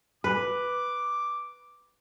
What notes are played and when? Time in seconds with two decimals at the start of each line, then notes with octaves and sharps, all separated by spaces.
0.24 B4 D6